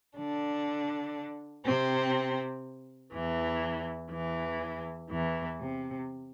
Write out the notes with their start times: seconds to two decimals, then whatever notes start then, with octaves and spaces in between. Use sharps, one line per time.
0.17 D3 D4
1.66 C3 C4
3.13 E2 E3
4.11 E2 E3
5.10 E2 E3
5.60 C3